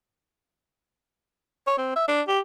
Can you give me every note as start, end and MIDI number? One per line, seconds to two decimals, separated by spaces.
1.67 1.76 73
1.78 1.93 60
1.96 2.07 76
2.08 2.21 62
2.28 2.39 67